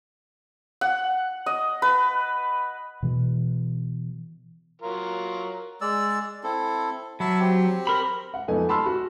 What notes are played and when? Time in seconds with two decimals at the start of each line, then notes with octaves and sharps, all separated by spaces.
0.81 F#5
1.46 D#5
1.82 B4
3.03 B2 E3
4.82 F#3 F4 A#4
5.81 G#3 D5 E6
6.43 C4 E4 A4
7.20 F#3 E5 A5 B5
7.40 C4 G4
7.87 A#4 B5
8.34 F#5
8.48 F2 A3 B3 D#4 G#5
8.69 A5 B5 C6 E6 F6
8.86 F#4